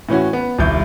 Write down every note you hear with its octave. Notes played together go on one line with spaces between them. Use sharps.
A2 E3 C#4 F#4
B3
D#1 C2 G6